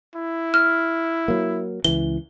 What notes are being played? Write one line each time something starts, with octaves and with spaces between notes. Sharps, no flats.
E4
F6
F#3 A#3
C#2 E3 G7